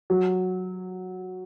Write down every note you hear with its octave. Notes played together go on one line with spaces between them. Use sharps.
F#3